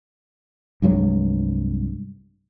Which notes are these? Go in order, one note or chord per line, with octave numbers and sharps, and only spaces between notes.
C2 G2 F#3 G#3